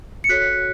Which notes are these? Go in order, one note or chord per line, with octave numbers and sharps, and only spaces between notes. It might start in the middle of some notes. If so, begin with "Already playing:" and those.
C#7
F#4 A4 C#5 F#6 B6